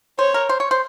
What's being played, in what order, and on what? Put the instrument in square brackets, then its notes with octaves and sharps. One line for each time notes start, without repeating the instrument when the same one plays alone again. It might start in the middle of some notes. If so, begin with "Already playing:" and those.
[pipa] C5 [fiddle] C#5
[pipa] A#4
C5
C#5
C5